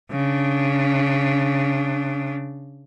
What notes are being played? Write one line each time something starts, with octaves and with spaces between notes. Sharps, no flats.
C#3 D4